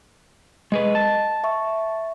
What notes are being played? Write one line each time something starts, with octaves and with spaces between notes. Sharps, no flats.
G#3 G#4 B4 D#5
A5
E5 C#6